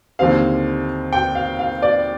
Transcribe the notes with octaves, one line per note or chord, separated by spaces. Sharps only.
D#2 D3 G3 C4 F5
G5
F5
F5
D5